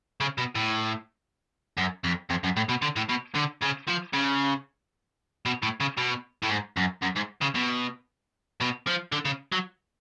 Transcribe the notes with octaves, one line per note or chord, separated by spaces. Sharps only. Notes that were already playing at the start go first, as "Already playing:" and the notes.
C#3
B2
A2
F#2
F2
F2
F#2
A2
B2
D3
A2
B2
D3
C#3
F3
C#3
B2
A2
C#3
B2
A2
G#2
F#2
F#2
G#2
C#3
B2
B2
F3
D3
C#3
F#3